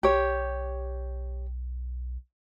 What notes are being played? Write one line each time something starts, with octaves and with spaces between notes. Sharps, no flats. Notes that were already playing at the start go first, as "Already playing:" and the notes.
B1 G4 C#5